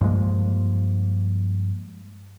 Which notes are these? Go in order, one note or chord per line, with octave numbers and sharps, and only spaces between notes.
G2 F3 G#3 A#3